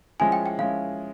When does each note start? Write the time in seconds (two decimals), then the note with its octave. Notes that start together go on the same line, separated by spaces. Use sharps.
0.20 F3 G#3 C#4 E4 G#5
0.32 G5
0.46 G5
0.58 F3 G#3 C#4 E4 F5